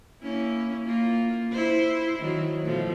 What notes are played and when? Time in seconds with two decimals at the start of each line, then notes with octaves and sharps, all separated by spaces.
0.22 A#3 C#4 E4
0.86 A#3 F4
1.52 E4 C5
2.19 D#3 F#3
2.63 B2 F3 A3